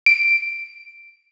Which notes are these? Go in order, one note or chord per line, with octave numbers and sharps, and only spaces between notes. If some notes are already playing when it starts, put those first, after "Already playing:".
D7